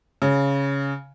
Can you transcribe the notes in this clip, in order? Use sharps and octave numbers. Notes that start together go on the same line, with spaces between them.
C#3